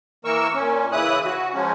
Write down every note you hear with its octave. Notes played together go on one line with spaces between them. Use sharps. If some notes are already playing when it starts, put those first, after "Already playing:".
E3 A#3 A#4 C#6 E6
A#2 C#4
C#3 E3 E4 B4 D#6 F#6
F#4
F3 F#3 G#3 C#4